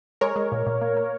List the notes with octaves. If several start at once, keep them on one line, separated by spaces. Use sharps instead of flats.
G#3 A#4 C#5
G#3
A#2
A#2
A#3
A#3